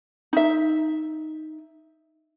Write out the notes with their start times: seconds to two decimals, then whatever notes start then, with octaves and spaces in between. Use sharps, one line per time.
0.33 D#4 E5